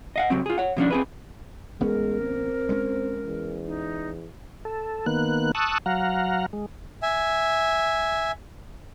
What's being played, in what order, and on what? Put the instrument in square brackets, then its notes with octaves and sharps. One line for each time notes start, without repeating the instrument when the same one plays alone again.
[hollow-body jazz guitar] D#5 F5 F#5
C3 E3 F#3 C4
F4 G#4
C#5 F#5
B2 F3 C#4 D4
C4 G#4 B4
[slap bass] A1 B3 C#4 [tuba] G#3 [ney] A#4
[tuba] C4
[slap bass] G3 G#3 C#4
[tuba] E2
[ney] D#4
[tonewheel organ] A4
D#3 A#3 B3 F#6
A5 C#6 D#6 E6 F#6
F#3 F5 F#5 A#5
G#3
[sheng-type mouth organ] E5 G#5